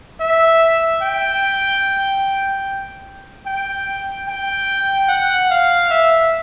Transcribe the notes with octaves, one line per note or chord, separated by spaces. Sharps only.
E5
G5
G5
G5
F#5
F5
E5